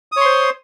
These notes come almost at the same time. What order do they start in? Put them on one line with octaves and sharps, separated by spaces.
D#6 C#5 C6 C5